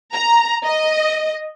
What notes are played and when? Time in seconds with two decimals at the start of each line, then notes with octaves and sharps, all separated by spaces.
0.14 A#5
0.64 D#5